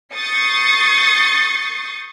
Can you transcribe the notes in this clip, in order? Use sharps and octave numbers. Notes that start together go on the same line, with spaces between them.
C#6 D#6 G6 A6 C7 C#7